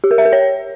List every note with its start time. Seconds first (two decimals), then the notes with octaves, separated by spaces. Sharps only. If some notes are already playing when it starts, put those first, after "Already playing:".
0.04 G4
0.11 A#4
0.18 E5
0.25 A#4
0.33 C#5